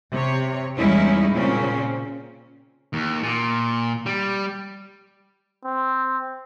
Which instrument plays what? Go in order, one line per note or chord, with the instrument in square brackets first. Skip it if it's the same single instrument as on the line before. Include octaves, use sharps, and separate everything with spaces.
[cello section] C3 C#5
E2 G3 G#3 C#4 D#4 E4
A#2 C#3 C4 C#4
[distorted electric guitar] D#2
A#2
G3
[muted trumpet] C4